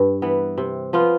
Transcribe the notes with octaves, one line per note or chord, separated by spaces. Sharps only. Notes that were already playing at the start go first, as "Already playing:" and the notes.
Already playing: G2
E3 B3
C3
F3 B3 F4